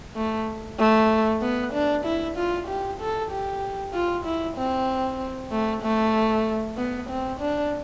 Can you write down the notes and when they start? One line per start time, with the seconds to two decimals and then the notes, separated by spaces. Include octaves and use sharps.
0.16 A3
0.79 A3
1.42 B3
1.73 D4
2.05 E4
2.37 F4
2.68 G4
3.00 A4
3.31 G4
3.94 F4
4.25 E4
4.57 C4
5.51 A3
5.83 A3
6.77 B3
7.09 C4
7.40 D4